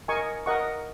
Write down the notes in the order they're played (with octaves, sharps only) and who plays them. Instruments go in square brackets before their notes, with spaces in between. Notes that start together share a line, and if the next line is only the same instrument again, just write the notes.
[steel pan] A#4 D#5 G#5 C#6
A#4 D#5 F#5 C#6